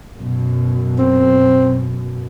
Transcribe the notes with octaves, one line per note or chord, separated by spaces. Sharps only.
F#2 B2
C4